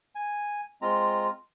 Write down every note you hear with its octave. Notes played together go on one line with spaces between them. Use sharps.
G#5
G#3 C4 F4 A#5